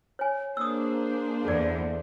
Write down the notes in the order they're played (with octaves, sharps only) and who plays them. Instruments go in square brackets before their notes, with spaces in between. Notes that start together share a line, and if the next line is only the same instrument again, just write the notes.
[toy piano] C#5 G#5
[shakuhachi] A#3 [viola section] D4 G#4 C5 [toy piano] D#6 E6
[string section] E2 [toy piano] A4 D5